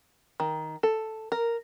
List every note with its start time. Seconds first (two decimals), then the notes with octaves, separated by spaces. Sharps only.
0.40 D#3
0.83 A4
1.32 A#4